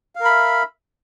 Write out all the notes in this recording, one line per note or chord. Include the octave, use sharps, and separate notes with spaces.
A#4 E5 F5 B5